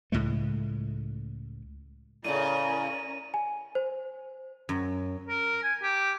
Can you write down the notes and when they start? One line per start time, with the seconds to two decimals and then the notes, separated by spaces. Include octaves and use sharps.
0.12 C#2 A2 G#3 A3
2.25 A2 C#3 C#4 A#4 D5 D#7
3.34 G#5
3.75 C5
4.69 F#2
5.29 A#4
5.63 G#5
5.83 G4